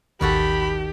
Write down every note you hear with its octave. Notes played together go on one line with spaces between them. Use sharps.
A1 D#2 D#3 F#4 G4 A4 B5